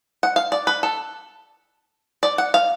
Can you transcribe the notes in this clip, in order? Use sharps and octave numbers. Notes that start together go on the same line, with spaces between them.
F#5
F5
D5
B4
A4
D5
F#5
F5